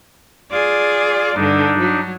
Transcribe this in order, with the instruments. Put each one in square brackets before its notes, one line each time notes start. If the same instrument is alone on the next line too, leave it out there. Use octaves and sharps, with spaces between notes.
[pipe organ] F4 [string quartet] G#4 D5
[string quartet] G2 D3 [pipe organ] D4 D#4
[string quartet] F#3